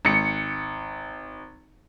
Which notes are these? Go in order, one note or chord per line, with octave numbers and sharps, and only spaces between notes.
G#1 C#7